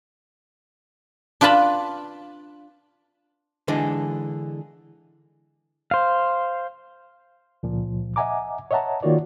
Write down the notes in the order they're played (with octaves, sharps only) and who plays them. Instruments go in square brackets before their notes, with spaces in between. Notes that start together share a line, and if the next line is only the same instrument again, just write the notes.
[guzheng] D4 F4 B4 D5 A5 B5
[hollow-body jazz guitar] D3 E3 G#3 D4
[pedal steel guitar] C5 F5
[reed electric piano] C#2 A#2 F3
D#5 E5 F#5 G#5 A#5 D6
C#5 D#5 E5 F#5 A5 A#5
D#3 A#3 F4 F#4 C#5 D5